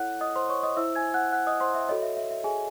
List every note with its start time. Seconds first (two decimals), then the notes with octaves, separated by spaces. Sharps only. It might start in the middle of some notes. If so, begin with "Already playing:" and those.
Already playing: E4 A4 C#5 F#5 F#6
0.21 D#5 D#6
0.36 C5 C6
0.50 C#5 C#6
0.63 D#5 D#6
0.77 E4 C5 E5 E6
0.95 G#5 G#6
1.14 F#5 F#6
1.32 F#5 F#6
1.47 D#5 D#6
1.61 C5 C6
1.74 E5
1.89 F#4 A4 C#5 D#5
2.02 E5
2.17 E5
2.31 E5
2.44 G#4 G#5